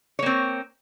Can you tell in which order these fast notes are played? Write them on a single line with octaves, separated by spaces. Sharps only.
C#5 A#3 C4